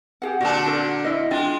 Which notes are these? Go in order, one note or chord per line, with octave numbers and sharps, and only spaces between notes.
G4 G#4 F#5
A#2 D3 D4 F#4 A5
F#4 A4
E4 D#5
G#3 D4 F4 G5